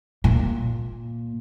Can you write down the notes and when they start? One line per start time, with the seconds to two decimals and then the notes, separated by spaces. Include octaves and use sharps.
0.24 A#2